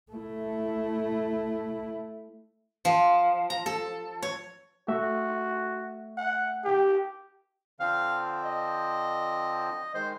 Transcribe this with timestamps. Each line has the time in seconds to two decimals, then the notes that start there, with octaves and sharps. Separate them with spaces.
0.12 A3 E4
2.85 F3
3.50 A#5
3.66 A4
4.22 C#5
4.88 A3 F#4 E5
6.17 F#5
6.64 G4
7.80 D3 F3 C4 F5
8.44 D#5
9.94 D#3 G#3 C5